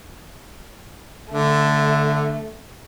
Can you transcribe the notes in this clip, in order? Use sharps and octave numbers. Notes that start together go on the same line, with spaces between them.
D3 A3